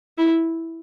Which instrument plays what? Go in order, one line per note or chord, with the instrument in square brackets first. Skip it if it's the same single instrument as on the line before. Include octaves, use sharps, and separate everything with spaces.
[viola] E4